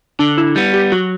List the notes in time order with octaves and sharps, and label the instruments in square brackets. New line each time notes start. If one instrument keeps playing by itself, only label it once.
[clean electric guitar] D3 [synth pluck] D4
[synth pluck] E4
[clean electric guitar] G3 B3
[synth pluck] G4
[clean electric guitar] F#3 [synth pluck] F#4